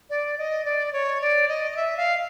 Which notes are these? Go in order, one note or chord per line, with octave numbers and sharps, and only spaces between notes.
D5
D#5
D5
C#5
D5
D#5
D#5
E5
F5